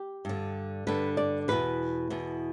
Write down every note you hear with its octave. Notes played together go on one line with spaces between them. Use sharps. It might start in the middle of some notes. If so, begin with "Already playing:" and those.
Already playing: G4
G2 D3
G2 D3 B4
D5
E2 B2 B4
E2 B2